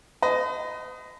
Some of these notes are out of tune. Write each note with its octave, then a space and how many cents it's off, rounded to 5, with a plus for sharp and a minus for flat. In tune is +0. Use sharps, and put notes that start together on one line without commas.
B4 +45 D#5 +0